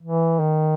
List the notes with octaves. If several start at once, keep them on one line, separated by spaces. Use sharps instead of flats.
E3
D#3